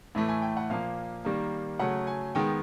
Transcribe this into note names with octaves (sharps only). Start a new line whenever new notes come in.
A2 E3 A3 E5
G#5
G5
F#5
A#2 F3 A#3 F5
D#3 G3 A#3
C#3 F#3 A3 F#5
G#5
D#3 G#3 B3 G5